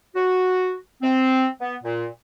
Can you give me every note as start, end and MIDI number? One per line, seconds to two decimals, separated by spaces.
0.15 0.73 66
1.02 1.47 60
1.60 1.75 59
1.83 2.06 46